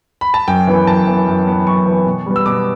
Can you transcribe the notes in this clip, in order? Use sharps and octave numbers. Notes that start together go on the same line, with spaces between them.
B5
A5
F#2 G5
E3 B3
F#2 A5
E3 B3
F#2
E3 B3
F#2 C#6
E3 B3
B2
G3 B3
E6
B2 D6